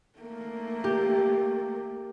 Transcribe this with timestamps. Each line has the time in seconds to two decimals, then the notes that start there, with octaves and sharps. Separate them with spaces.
0.19 A3 A#3
0.84 G4